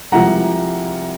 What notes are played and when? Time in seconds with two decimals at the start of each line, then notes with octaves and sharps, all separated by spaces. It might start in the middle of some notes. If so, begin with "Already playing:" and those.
0.12 C2 C3 F3 G#3 F#5 A#5